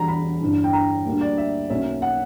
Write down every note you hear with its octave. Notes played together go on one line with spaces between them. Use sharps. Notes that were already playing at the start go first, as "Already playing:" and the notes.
Already playing: E1 E2 B2 G3 A#5
B5
G1 G2 E3
G5
A#5
D2 D3 G3 A#3
D5
E5
B1 B2 F#3 A#3 C#4 E5
F#5